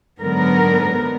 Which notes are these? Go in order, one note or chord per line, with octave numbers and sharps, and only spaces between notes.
G#2 D3 F#3 B3 A#4